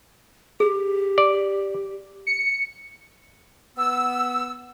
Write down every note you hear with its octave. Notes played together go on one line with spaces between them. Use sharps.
G4 G#4
D5
C#7
B3 E6